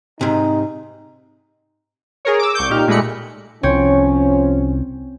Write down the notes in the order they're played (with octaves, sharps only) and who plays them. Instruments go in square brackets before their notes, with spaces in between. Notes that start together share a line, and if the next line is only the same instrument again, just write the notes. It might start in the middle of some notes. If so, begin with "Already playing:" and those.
[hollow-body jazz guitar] G#2 C3 [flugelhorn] D#4
[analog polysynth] G#4 A#4 C#5
D6 E6
C2 C#6 D6 G6
A#2 D#4 G4 F6
A#2 G#3 A3 B5 C#7
[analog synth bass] C2 [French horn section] F3 C#4 [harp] C4 C#5